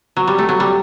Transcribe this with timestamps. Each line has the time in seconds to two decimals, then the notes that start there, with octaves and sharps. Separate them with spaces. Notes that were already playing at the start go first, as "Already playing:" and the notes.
0.17 F#3
0.27 G3
0.38 A3
0.49 F#3
0.60 G3